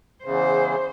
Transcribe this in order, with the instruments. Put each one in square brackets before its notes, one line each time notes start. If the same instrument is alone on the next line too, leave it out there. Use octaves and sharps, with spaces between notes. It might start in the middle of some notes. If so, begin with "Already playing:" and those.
[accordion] E2 C#3 [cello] C5